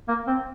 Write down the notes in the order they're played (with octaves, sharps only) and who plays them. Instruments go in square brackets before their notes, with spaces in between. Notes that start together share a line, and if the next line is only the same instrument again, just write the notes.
[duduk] A#3
C4